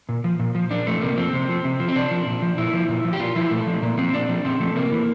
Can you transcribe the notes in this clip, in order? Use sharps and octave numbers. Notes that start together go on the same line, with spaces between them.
A#2
F3
A#2
F3
A#2 D4
F3 A3
C3 A#3
F3 C4
C3
F3
C3
F3
C4
C3 D4
F3
A#2
F3
A#2 E4
F3
A#2
F3
G4
A#2 F4
F3 E4
A#2 A3
F3
A#2 A#3
F3 C4
A#2 D4
F3
A#2 C4
F3 A3
C3 A#3
E3